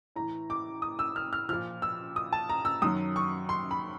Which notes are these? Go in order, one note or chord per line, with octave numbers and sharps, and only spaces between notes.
A2 E3 A#5
D6
D#6
E6
F6
F6
A#2 F3 F6
E6
D#6
A5
A#5
E6
F#2 D#3 F#3 D#6
C#6
C6
B5